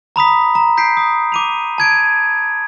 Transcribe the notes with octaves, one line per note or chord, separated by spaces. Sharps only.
A#5 B5 D#6 B6
A#5
G6 B6 C7 D7
D#6
D6 D#7 F7
A5 G#6 D7